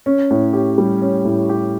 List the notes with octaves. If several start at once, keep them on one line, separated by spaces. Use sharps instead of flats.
C#4
A2
G4
G3
C#4
A2
G4